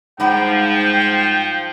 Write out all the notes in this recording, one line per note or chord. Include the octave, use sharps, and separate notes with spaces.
G#2 F3 G3 D#4 F#5 G5